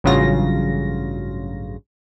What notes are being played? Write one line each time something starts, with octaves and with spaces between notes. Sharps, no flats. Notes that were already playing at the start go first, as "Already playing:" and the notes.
A1 G2 C#3 F#3 F4 A#6